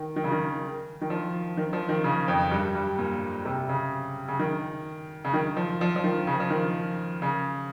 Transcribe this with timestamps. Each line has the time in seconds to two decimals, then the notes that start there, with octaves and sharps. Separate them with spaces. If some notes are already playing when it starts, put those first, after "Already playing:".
Already playing: D#3
0.16 D#3
0.24 C#3
0.31 D#3
1.01 D#3
1.10 F3
1.57 D#3
1.73 F3
1.89 D#3
2.04 C#3
2.28 F2
2.51 G2
2.75 G2
2.98 A#2
3.45 C3
3.69 C#3
4.28 C#3
4.39 D#3
5.25 C#3
5.34 D#3
5.56 F3
5.81 F3
5.96 F3
6.04 D#3
6.27 C#3
6.40 F3
6.50 D#3
7.22 C#3